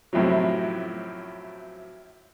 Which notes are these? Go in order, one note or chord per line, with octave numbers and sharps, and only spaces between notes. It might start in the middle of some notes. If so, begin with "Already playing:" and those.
F#2 A2 C3 F3 F#3